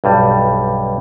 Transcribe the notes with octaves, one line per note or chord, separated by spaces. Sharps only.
B1 G2 G3